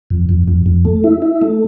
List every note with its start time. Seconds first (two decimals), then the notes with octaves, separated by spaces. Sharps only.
0.10 F2
0.29 F2
0.48 F2
0.66 F2
0.85 A3
1.04 E4
1.22 E4
1.42 A3